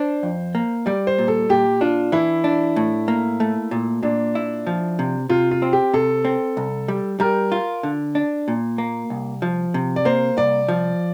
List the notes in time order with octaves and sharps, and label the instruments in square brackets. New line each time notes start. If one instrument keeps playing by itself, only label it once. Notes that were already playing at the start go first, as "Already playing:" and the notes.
Already playing: [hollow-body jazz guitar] D4 [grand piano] C5
[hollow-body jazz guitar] F2
A#3
[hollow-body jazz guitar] G3 [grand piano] D5
[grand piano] C5
[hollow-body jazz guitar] A#2
[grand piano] A4
[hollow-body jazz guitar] A#2 [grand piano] G4
[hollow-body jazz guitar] D4 [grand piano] F4
[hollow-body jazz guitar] E3 [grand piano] E4
[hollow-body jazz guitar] D4
A2
A#3
A3
A#2
[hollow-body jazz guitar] A#2 [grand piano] D4
[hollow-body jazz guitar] E4
F3
C3
[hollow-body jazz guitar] C3 [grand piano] F4
[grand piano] F4
[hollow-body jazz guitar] C4
[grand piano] G4
[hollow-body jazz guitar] C3 [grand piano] A4
[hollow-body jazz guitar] C4
C2
G3
[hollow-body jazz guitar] G3 [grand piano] A#4
[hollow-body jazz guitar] F4
D3
D4
A#2
A#3
C2
F3
C3
[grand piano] D5
[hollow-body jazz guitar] A#3 [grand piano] C5
[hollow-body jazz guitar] C2 [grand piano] D5
[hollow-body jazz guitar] F3